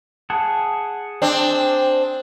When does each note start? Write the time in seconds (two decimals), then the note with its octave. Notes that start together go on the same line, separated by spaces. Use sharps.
0.30 G#4 F#5 A5
1.22 C4 D4